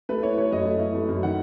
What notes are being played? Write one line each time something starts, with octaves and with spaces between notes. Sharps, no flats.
A3 B4
E4 C#5
A3 C#5
F#2 D#5
A3
E4
A3
F#2
D#3 F#5